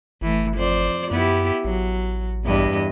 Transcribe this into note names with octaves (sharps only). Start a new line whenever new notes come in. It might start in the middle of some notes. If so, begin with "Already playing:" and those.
G1 E3 A3
F2 C5 D5
F#2 B3 E4 G4
A1 F#3
E2 G2 D#5